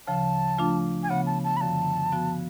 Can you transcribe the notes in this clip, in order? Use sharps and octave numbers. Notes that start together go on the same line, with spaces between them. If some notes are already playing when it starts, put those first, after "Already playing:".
D2 C#3 F3 A5
F3 A3 D4 F4
G#5
C#3 F3 B3 F#5
A5
A5
B5
F#2 D3 F3 A5
F3 B3 F#4